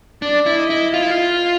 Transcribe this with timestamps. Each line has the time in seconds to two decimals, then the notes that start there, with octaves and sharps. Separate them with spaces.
0.22 D4 D5
0.46 E4
0.58 D#5
0.70 E4
0.94 F4 F5
1.02 E4
1.11 F4